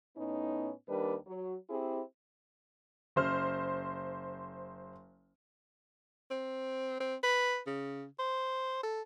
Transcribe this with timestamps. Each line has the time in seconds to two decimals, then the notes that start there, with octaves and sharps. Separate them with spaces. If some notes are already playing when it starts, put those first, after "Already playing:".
0.17 A2 B3 C#4 D#4
0.88 D#2 G3 D4 A#4 B4
1.27 F#3
1.70 C4 E4 G4 G#4
3.16 F#1 C5 F6
6.31 C4
7.00 C4
7.23 B4
7.67 C#3
8.19 C5
8.83 A4